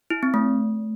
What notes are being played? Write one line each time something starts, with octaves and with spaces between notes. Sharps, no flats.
E4
C4
A3